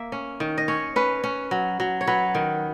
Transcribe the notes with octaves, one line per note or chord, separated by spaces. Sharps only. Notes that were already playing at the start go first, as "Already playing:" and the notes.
Already playing: A#3 E5
C#4
D#3
D#5
C#4 C#5
C#4 B4
C#4
F#3
F#3
C#5
F#3 B4
D#3